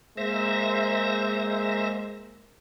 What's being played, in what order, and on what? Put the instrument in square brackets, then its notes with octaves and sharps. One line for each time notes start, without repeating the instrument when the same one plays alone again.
[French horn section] G#3 A#3 [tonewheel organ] C5 E5 A#6